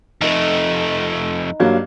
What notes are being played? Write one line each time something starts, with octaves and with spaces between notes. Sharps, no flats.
F2 A3 D#4 B4
G2 F#3 A#3